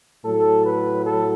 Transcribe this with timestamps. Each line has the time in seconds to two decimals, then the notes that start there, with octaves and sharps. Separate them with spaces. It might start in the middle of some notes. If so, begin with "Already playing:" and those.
0.24 A2 F#3 A4
0.65 B4
1.05 A4